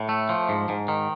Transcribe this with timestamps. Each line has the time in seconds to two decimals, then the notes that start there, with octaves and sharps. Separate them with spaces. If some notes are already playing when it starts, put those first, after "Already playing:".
Already playing: A2
0.09 A3
0.29 F3
0.49 G#2
0.69 G#2
0.88 D#3